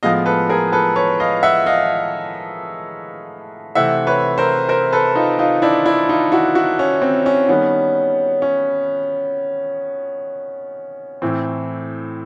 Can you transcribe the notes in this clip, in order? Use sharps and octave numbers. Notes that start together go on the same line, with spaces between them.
A2 F3 G#3 B3 D#5 F5
A4 B4
G#4 A#4
A4 B4
B4 C#5
D#5 F5
E5 F#5
D#5 F5
C3 E3 A3 C4 E5 F#5
B4 C#5
A#4 C5
A#4 C5
A4 B4
D#4 F4
D#4 F4
D4 E4
D4 E4
D#4 F4
E4 F#4
E4 F#4
C#4
C4
C#4
D#3 G3 B3 C#4
C#4
A2 E3 A3 C4